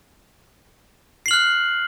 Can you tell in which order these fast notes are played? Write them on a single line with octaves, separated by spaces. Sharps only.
C7 F#7 F6 F#6